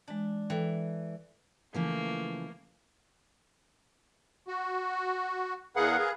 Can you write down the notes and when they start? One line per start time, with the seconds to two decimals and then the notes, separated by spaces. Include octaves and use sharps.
0.08 E3 G#3 D4
0.50 E3 A4 G5
1.74 C#3 E3 F3 A3 A#3
4.48 F#4
5.76 E2 G#4 A#4 B4 F5 F#5
5.98 G#4